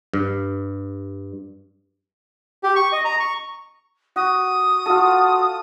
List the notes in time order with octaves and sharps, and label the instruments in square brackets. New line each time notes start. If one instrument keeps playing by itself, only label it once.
[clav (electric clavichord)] G2
[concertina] G4
C#6
D#5
A#5
C#6
[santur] F#4 [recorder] D#6
[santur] F4 A4 [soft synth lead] F#4